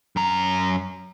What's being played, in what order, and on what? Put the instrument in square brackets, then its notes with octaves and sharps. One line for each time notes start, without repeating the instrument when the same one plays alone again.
[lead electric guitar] F#2 A#5